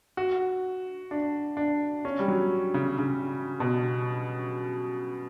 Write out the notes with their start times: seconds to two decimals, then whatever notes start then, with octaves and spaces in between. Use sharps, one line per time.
0.17 F#4
1.11 D4
1.57 D4
2.05 C#4
2.20 G3
2.28 F#3
2.74 C#3
2.98 C#3
3.60 B2